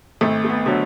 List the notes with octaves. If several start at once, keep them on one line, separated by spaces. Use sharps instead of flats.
G#1 A3
A3
B3
D3 F#3